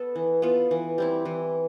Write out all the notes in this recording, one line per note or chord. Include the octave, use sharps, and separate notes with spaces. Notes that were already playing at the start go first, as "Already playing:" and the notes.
Already playing: B3 A4
E3
B3 F4 A4
E3
G3 C4 E4
E3